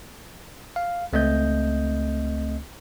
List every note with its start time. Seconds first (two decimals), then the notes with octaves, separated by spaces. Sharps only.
0.76 F5
1.13 C#2 A3 C4 D#5 G6